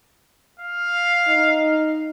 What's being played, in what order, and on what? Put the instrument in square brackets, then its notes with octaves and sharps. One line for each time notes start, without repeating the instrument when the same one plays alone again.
[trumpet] F5
[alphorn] D#4